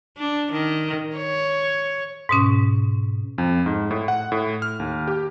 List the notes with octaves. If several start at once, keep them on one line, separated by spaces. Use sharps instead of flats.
D4
D#3
C#5
G#2 B2 C#4
F2
G#2
A2
F#5
A2
F6
D#2
G4